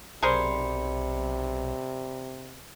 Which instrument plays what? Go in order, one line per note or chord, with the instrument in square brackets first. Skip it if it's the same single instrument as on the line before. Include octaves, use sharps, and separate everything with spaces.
[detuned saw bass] B1 [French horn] C3 [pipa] G#4 A#4 C5 [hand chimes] D5 B5 C#7